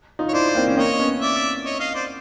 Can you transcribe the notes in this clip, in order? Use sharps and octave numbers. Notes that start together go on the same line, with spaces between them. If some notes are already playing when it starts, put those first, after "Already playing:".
D#4 F4
C#5
D4 E4 C5 D5
A#3 C4
C#4
A#3 C4 C#5 D#5
B3 C#4
D5 E5
C#5 D#5
D#5 F5
C5 D5